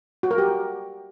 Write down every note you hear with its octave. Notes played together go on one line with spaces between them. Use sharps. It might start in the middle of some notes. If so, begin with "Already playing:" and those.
F#4
A#4
G4